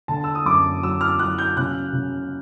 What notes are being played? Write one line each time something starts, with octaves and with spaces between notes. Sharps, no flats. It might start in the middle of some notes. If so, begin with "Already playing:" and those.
D3 A5
E6
D#6
F#2 D6
F#3 E6
F6
F#3 F#6
G6
C#3 F#6
C#3